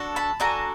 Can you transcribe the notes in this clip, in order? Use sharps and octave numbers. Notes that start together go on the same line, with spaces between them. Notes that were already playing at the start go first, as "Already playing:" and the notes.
Already playing: D4 F#4 A4
A5 B5
D4 F#4 A4 G#5 A#5